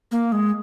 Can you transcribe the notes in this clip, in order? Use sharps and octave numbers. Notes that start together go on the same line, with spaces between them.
A#3
G#3